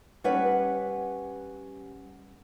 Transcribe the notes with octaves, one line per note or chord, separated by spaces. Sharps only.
G3 C#4 B4 E5 F#5